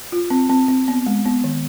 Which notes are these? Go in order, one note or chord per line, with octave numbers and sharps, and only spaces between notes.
F4
C4
C4
C4
B3
G#3
B3
D#3